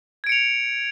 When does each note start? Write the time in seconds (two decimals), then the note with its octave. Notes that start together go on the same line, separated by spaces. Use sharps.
0.24 G#6
0.27 D7
0.29 C#7
0.32 F7